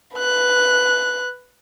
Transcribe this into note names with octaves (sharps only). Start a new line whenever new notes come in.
B4 F#6